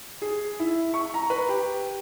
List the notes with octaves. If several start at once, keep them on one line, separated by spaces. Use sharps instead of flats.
G#4
E4
C#6
A#5
B4
G4